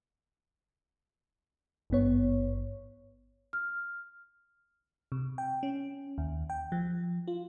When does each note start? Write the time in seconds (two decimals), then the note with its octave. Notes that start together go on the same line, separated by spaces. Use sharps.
1.90 G#1 G2 B3 C#5
3.53 F6
5.12 C3
5.38 G5
5.63 C#4
6.18 D#2
6.50 G5
6.72 F3
7.28 F4